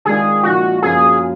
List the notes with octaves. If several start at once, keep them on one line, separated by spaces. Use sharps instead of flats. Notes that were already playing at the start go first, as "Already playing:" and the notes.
D#3 G#3 D4 F4 G#4
A#2 F3 A#3 D#4 F#4
F#2 F3 A#3 F4 G#4